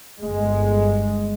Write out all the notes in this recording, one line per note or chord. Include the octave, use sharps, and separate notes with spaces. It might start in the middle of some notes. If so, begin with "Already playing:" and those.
G1 G#3